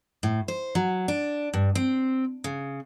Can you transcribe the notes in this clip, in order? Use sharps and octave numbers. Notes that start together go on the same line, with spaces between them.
A2
C5
F#3
D4
G2
C4
C#3